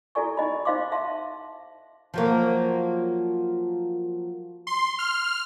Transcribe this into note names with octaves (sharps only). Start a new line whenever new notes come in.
E4 F#4 A4 D5 G#5 C#6
D#4 D#5 B5
D#4 C5 D#5 F5 C6 D6
E5 F5 A5 C6
F3 F#3 A#3
C6
F6